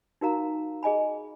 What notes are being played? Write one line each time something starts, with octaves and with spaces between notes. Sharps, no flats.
D#4 F#4 A#4 F5 A#5
G#4 D#5 G#5 B5